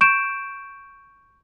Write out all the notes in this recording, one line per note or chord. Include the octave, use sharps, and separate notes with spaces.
C#6 G6 D7 E7